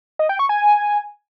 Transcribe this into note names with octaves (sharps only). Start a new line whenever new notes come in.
D#5
G5
C#6
G#5